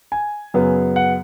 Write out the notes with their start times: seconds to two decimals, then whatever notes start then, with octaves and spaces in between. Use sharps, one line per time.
0.12 G#5
0.54 F#2 C#3 F#3 B3
0.96 F#5